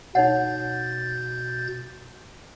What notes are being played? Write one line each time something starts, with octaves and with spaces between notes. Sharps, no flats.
B2 D#4 C#5 F#5 G6 A6